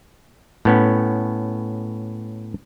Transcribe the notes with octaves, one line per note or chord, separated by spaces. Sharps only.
A2 B3 C#4